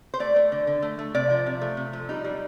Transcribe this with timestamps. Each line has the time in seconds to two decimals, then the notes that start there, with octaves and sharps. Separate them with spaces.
0.14 C5
0.20 A3 D5
0.36 A3
0.52 D3
0.67 D3
0.82 A3
0.99 A3
1.15 C3 D5
1.30 F3
1.46 C3
1.61 A3
1.77 C3
1.93 F3
2.09 G3 D#4
2.24 G3